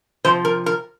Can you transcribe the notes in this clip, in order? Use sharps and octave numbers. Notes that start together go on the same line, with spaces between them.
C3 F3 C5
A#4
A#4